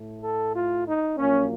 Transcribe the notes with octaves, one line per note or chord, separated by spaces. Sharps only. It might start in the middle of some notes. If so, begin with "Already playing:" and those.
Already playing: A2 A3
A4
F4
D#4
A#1 A#2 F#3 A#3 C#4